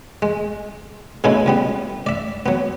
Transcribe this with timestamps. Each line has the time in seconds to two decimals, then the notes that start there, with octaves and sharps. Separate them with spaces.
0.22 G#3
1.24 B2 G#3 A3 C#4 D#4 E4
1.46 C#2 G3 B3
2.06 D5 E5
2.46 F#3 B3